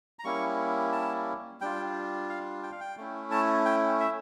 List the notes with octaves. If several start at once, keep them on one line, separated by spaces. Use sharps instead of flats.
A#5
G3 A#3 C#4 E4 C#6
A5
G3 D4 F4 G5
F5
G5
F5
G5
A3 C#4 E4
A5
G5
E5